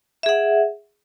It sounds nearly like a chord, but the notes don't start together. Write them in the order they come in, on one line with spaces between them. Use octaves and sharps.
E5 G#4 F#5